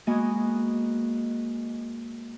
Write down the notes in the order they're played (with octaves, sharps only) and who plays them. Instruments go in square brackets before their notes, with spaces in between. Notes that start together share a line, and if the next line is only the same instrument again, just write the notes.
[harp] G#3 A#3 B3 F#4 D#5 G#5